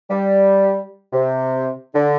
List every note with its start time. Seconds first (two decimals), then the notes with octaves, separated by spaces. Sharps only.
0.10 G3
1.13 C3
1.94 D3